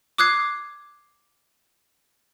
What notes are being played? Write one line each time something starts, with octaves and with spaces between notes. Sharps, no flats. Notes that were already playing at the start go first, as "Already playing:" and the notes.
D6 D#6 F#6 G#6 C7